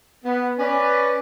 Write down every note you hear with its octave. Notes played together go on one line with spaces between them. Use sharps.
B3
C#4 B4 D5